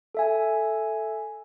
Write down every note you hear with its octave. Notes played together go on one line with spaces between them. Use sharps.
A4 E5 G#5